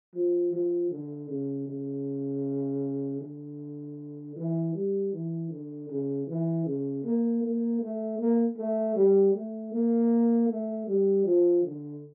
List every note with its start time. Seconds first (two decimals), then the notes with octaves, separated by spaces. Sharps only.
0.15 F3
0.53 F3
0.91 D3
1.29 C#3
1.68 C#3
3.21 D3
4.36 E3
4.75 G3
5.13 E3
5.51 D3
5.89 C#3
6.28 E3
6.66 C#3
7.04 A#3
7.43 A#3
7.81 A3
8.19 A#3
8.57 A3
8.96 G3
9.34 A3
9.72 A#3
10.49 A3
10.88 G3
11.25 F3
11.64 D3